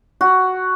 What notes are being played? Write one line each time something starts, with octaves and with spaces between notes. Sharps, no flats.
F#4